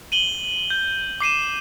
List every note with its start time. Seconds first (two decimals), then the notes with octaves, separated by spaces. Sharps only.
0.12 D#7 F#7 G7
0.70 G6
1.20 D6 C7 D#7 E7